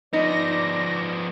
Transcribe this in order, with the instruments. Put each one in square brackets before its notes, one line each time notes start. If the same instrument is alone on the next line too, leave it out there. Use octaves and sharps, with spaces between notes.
[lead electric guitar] F3 B3 [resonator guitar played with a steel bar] D#4 [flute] D5 [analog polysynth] A#6